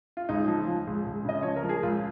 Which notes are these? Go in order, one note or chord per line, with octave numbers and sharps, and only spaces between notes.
F4
C#2 D#4
F3
F3
C#2
C#2
C#3 D#5
F3 C#5
A#4
F3
G#4
C#2 F4